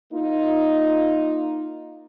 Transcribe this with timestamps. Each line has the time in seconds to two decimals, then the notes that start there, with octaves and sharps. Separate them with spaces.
0.12 A#3 D#4 F4